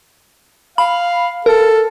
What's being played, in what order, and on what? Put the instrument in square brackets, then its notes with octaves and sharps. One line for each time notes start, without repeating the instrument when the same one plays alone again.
[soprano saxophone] F5 [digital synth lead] B5
[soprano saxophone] A4 [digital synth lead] A#4